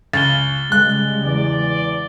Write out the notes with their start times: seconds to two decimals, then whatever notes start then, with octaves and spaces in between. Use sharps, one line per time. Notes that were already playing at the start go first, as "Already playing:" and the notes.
0.13 C#2 A6 G7
0.72 C#3 G3 G#3 F#6
1.25 E2 D5